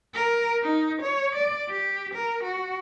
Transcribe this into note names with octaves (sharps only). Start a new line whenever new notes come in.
A#4
D#4
C#5
D5
G4
A#4
F#4